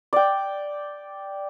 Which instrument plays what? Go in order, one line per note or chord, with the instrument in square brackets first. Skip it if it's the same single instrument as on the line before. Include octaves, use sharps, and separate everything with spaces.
[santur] D5 G5